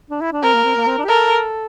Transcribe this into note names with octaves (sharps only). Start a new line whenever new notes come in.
D4
E4
D4
C4 A#4
A#3
C4
A#3
C4
D4
G4
A4 A#4